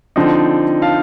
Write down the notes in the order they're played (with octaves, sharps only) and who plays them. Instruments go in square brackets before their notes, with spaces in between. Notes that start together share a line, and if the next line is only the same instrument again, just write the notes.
[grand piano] D3 F3 C4 D#4
F5 A5